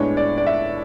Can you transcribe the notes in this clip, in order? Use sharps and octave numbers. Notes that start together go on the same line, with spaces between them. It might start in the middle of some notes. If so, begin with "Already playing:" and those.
Already playing: A2 G#3 B3 D4 C#5
D5
D5
E5